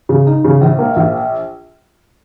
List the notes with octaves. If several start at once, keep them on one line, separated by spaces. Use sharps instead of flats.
C#3
D#4
C#3
A#1
A#3
A#1